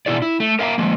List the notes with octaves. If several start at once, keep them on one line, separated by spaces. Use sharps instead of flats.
B2 E4 G#4 D5
E4
A3
A#4 E5 F5 G5 A#5
F3 G#3 A#3